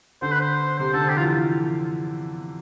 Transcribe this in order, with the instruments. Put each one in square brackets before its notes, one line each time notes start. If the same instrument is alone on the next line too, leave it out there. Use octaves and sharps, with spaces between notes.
[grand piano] D3 [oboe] C5
[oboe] B4
C5
[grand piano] C3 [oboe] C5
[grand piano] D3 [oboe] A4
[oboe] G4
[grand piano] E3 [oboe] F4
[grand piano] F3